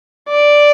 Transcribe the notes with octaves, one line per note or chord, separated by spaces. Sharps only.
D5